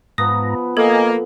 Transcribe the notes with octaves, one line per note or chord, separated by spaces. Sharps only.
G#2 F3 B3 B4 A#5 D#6
A#3 A4 D#5 G#5